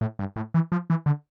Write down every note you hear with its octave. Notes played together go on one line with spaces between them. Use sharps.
A2
G2
A2
E3
F3
E3
D3